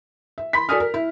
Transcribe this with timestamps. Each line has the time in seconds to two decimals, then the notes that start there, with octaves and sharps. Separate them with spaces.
0.38 E5
0.53 B5 C6 B6
0.69 F#4 A4 D5 G#5 D#6 F6
0.80 A#4
0.94 E4